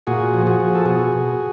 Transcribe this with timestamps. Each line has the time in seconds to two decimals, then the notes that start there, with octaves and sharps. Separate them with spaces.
0.07 A#2 F#4 G#4
0.34 F3
0.46 F#4 G#4
0.60 F3
0.75 A4
0.85 B2 F#4 G#4
1.12 B2